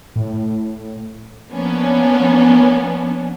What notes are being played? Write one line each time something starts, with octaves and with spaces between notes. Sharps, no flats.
A2
F3 A#3 B3 C#4 D4